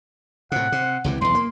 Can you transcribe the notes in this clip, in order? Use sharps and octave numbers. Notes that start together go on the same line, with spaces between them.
A2 C3 F#5
C3
C#2 C3 E3
B1 E2 C6
A#3